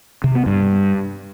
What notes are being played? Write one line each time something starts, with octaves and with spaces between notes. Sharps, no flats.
C3
B3
G2